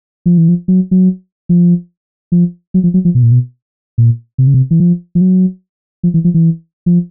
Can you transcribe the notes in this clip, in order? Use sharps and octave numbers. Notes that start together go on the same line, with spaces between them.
F3
E3
F3
F#3
F#3
F3
F3
F#3
F3
F#3
F3
B2
A#2
B2
A#2
C3
C#3
C3
E3
F3
F3
F#3
F3
E3
F3
E3
F3